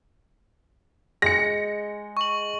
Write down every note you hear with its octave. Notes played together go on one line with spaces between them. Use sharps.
G#3 A#6 C#7
C#6 F#7